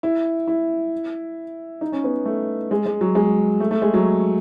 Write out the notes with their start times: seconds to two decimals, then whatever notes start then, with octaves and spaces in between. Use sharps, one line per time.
0.03 E4
0.47 E4
1.81 D#4
1.92 C#4
2.04 B3
2.26 A3
2.71 G#3
2.86 G#3
3.01 F#3
3.15 G#3
3.60 A3
3.71 A3
3.82 G#3
3.94 F#3